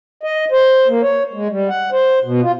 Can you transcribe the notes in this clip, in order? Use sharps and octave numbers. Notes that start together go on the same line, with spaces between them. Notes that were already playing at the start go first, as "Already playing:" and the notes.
D#5
C5
A#3
C#5
G#3
G3
F#5
C5
B2
F4